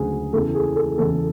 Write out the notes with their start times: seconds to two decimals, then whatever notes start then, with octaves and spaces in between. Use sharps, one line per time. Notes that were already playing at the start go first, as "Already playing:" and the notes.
Already playing: D2 C#3 F#3 G#4
0.33 E2 C#3 E3 A4
0.54 G#4
0.76 A4
0.98 E2 C#3 E3 A4